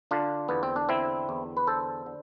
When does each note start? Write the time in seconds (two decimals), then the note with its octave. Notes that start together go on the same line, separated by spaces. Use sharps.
0.11 D3 D4 F4
0.48 E2 B3
0.63 C4
0.76 D4
0.89 D3 C4 E4
1.29 E2
1.57 B4
1.67 D3 A4 C5
2.06 D3